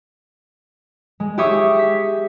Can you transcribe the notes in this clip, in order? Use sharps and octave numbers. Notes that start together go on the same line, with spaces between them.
G#3
G4 G#4 C#5 E5 C#6 D#6
B6